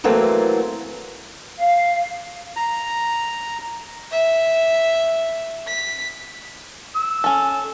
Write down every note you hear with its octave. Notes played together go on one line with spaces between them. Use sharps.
E3 F#3 A3 A#3 C4
F5
A#5
E5
B6
E6
C#4 A4